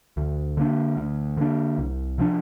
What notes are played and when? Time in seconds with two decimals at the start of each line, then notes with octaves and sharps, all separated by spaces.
0.17 D2
0.57 D3 A#3 D4
0.97 D2
1.37 D3 A#3 D4
1.78 C2
2.18 C3 F3 D4